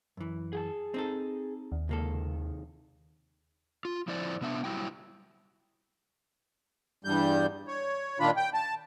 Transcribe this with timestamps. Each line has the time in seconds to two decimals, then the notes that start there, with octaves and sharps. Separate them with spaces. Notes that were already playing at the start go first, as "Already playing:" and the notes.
0.17 F#2 E3
0.53 G#4 G5 A5
0.94 C4 D#4 A4
1.72 D#2
1.89 C#2 C3 D#3 A#3 A4
3.85 F4
4.08 F3 E4 C5 D5
4.41 C3 B3 D4 E5
4.64 F#3 G3 E4 G5
7.05 E2 G2 G3 G6
7.68 C#5
8.20 A#2 D#3 D4 F4 B5
8.37 G5
8.54 A5